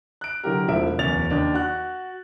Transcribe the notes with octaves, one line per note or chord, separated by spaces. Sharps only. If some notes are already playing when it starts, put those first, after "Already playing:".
F#6 D7
D3 F#3 E4 G4 A#4
E1 F3 A3 E5 D7
D1 E2 C#4 A6 F7
D#2 D4
F#4 F#6